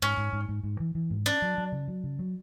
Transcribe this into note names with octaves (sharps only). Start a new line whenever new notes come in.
G#2 C#4
G#2
G#2
G#2
G#2
E3
E3
G#2
C#4 D4
F#3
F#3
C#3
F#3
C#3
F#3